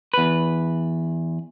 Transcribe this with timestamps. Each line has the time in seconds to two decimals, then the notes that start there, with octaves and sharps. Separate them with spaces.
0.14 E2 B4